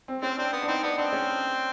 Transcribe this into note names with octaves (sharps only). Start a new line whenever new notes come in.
C4
C4 C#4
C4 D4
B3
D4
C4 D#4
B3 D4
C4 D4
C#4